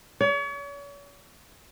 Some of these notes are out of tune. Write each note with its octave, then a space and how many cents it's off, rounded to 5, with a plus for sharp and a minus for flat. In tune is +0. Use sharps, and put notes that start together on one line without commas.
C#5 +40